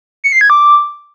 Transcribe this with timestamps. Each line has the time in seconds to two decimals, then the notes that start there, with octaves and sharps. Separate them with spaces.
0.24 C#7
0.32 C7
0.41 G#6
0.50 D6